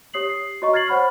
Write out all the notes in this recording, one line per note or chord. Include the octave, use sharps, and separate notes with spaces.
G4 C#5 D#6 C7 F#7
C7
F#4 C#5 D#5 A#5 C#6
F6 G#6 A6 C7 F#7
C5 C#5 F#5 B5 C#6 F6